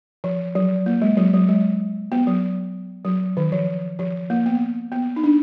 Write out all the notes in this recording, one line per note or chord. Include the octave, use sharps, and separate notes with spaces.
F3
F#3
A#3
G#3
F#3
F#3
G#3
B3
F#3
F#3
D#3
F3
F3
A#3
B3
B3
D#4
D4